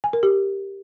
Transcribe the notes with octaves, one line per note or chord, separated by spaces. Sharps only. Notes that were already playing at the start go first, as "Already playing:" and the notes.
G#5
A#4
G4